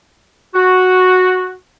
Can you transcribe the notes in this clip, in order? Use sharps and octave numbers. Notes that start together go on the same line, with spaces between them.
F#4